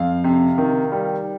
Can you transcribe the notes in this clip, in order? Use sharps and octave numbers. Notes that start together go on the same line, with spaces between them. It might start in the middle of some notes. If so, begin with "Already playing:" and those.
Already playing: F2 F5
C3
D#3
G3